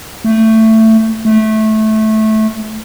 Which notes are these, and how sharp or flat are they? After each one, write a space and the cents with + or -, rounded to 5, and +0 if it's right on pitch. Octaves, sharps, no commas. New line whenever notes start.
A3 +15
A3 -15